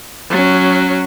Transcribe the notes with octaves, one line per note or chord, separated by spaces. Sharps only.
F#3 C#4